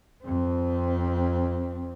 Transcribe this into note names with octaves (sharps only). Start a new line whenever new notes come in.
F2 C4